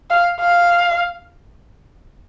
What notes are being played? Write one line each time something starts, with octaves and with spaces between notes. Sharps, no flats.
F5
F5